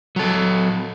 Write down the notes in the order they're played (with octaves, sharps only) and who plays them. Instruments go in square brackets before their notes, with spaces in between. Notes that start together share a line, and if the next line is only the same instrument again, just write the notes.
[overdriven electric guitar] F#3 A4